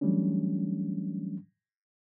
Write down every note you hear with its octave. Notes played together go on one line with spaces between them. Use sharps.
E3 F#3 G3 A3 C#4 D4